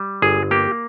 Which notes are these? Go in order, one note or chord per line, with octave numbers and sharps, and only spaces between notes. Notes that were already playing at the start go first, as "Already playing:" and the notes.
Already playing: G3
G1 G#4
A#3 G4